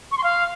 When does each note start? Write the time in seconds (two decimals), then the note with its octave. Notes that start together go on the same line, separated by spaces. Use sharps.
0.12 C#6
0.18 C6
0.24 F5